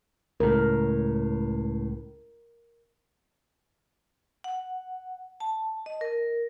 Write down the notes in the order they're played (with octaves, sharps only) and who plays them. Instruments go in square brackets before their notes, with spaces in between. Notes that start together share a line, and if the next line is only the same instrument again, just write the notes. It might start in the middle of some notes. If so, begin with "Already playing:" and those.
[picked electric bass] C#2 A2 [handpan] A#4
[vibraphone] F#5
A5
D#5
A#4